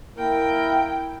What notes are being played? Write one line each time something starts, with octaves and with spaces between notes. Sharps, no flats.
A#3 E4 A#4 G5